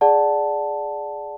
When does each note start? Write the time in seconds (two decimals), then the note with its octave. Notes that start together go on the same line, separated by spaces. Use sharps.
0.01 G#4 D5 F#5 A5